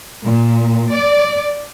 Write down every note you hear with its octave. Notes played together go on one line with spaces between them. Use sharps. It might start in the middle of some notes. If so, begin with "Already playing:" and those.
A#2
D5